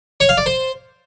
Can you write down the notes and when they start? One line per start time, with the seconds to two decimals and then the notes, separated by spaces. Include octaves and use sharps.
0.20 C#5
0.29 F5
0.38 D5
0.46 C5